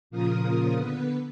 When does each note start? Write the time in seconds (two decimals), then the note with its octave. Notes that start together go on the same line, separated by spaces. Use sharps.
0.10 A#2 C#3 F3 F4 A#4 D#6
0.76 D3 B3 B4